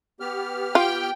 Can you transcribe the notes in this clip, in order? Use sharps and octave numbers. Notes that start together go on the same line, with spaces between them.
B3 G4 F6
F4 G5